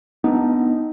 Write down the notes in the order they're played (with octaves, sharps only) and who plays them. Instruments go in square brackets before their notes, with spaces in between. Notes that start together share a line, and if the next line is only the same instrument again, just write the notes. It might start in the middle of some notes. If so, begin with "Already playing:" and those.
[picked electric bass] B3 D4 [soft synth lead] D#4